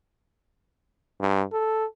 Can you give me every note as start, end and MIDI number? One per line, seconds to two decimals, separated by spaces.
1.20 1.44 43
1.53 1.85 69